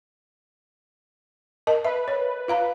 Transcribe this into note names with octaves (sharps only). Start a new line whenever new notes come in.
A#4 D#5 A5
B4 E5
C#5
F4 F5 A#5